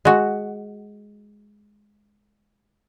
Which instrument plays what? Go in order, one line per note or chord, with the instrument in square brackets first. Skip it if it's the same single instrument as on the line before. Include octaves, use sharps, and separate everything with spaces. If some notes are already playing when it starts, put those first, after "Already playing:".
[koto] G#3 F#4